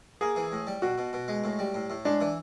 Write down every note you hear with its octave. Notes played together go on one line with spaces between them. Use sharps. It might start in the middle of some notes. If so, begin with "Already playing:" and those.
A#3 G#4
E3
A2
G3
B2 F#4
B2
B2
G#3
A2
G3
A2
A2
G#3 D4
E3